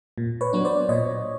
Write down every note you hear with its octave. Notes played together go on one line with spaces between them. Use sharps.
A#2
B4 C#5
F#3 B3 D4
C5 D5
A#2 C#5 D#5